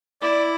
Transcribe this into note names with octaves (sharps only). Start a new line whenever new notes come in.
E4 D5